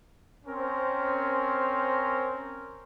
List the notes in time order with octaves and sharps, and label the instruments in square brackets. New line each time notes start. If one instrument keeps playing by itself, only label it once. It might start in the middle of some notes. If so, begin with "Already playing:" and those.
[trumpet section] C4 C#4 A#4 C5